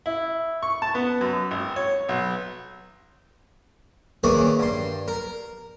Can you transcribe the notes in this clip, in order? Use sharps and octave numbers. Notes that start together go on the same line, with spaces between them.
E4
C#6
A5
B3
F#2
G#1
C#5
B1
D#3 E3 A#3 G#4 C#5 D5
G2 C6
A#4